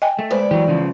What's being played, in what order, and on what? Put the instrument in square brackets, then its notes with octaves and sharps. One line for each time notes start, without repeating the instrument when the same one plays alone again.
[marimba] D#5 G5 G#5
[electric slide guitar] A3
[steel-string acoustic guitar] D2 B3 D5 [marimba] G#3 B4 C5
[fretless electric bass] E3 [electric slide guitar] F#3 G4
[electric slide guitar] C#3 F3